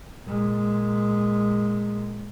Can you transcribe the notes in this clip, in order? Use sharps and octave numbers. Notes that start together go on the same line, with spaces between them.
A#2 G#3